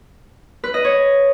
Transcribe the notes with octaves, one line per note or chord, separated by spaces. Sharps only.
B4
D#5
C#5